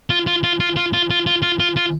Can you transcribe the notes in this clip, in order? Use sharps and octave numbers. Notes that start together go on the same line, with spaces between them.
F4
F4
F4
F4
F4
F4
F4
F4
F4
F4
F4